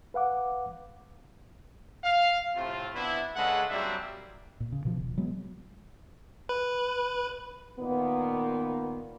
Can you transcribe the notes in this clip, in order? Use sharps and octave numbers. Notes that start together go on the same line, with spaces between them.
B4 F5 F#5 D6
F5
A2 C3 A3 C4 F4
C3 B3 D4 E4
C#3 G#3 D4 A4 B4 F#5
F#3 G3 A#3 C4 D4 E5
A#2
C#3
B2 F3
D#1
F#3 G#3 B3
B4
A#2 D#3 A#3 B3